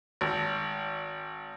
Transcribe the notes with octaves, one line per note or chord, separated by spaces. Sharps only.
G#1